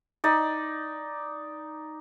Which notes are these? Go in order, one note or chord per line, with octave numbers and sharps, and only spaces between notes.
D#4 D5